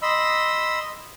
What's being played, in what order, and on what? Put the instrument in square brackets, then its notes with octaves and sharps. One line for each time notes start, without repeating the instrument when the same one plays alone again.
[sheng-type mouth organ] D#5 B5 C6 E6